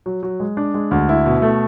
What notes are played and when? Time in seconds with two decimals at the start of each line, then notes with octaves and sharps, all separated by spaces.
0.06 F#3
0.23 F#3
0.40 G#3
0.57 D4
0.74 G#3
0.91 D2
1.09 E4
1.25 B2
1.42 A3